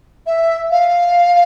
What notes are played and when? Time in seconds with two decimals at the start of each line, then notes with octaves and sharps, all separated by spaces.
0.27 E5
0.71 F5